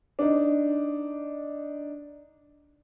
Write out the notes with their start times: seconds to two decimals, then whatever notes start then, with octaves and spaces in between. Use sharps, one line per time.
0.19 D4 D#4